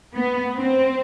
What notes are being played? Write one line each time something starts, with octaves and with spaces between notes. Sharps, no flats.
B3
C4